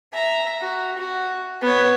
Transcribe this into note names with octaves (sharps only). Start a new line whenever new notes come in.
E5 A#5
F#4
F#4
B3 C#5